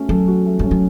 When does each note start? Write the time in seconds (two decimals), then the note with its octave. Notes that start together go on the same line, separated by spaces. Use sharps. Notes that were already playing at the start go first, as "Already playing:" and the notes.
Already playing: A3 C#4 F#4
0.09 F#3 A4
0.28 F#4
0.46 A3
0.59 G3 C#4
0.71 F#3